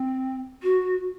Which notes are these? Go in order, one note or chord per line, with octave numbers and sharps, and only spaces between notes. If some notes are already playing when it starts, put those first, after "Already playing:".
Already playing: C4
F#4